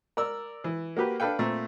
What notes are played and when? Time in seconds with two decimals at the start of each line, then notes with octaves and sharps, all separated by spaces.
0.17 A#4 D5 E6
0.64 E3
0.97 A#3 F#4 G4 B4
1.20 D4 A4 B4 F5 G5
1.39 A#2 A3 C4